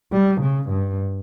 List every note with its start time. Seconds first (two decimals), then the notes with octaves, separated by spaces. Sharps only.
0.13 G3
0.41 C#3
0.70 G2